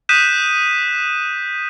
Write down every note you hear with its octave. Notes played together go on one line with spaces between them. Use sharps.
D#6 F#6 G6 B6 D#7 E7